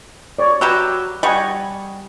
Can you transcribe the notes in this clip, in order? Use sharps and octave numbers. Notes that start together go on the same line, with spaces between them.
C#5 D5
F#3 G4 B4 E6
G3 D#5 F#5 G#5 C#6